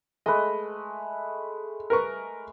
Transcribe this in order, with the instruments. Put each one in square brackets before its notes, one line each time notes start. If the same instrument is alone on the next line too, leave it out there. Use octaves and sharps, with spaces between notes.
[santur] G#3 A3 B4 [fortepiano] D#5
[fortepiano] A#4 B4 C#6